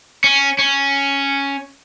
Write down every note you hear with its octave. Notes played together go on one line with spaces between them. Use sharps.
C#4
C#4